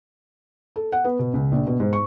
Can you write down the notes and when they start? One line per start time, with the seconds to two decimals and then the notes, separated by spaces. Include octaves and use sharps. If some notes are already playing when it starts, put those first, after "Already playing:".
0.76 A4
0.92 F#5
1.04 B3
1.19 B2
1.34 C#2
1.52 A#1
1.67 B2
1.80 G#2
1.93 C#6